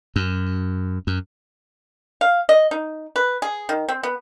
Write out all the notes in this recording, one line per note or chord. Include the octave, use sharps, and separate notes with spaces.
F#2
F#2
F5
D#5
D#4
B4
G#4
D#3
C4
B3